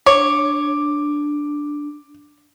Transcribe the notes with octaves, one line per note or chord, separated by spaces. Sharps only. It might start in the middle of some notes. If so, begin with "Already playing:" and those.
D4 C#5 D6